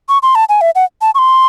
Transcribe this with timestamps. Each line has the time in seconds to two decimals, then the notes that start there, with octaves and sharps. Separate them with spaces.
0.09 C#6
0.23 C6
0.35 A5
0.49 G#5
0.61 E5
0.75 F#5
1.02 A5
1.15 C#6
1.19 C6